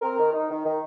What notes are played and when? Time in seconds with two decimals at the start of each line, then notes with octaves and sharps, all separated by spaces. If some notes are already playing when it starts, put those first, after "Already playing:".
0.02 C4 A#4
0.18 D#3
0.33 D#4
0.50 D#3
0.65 D#3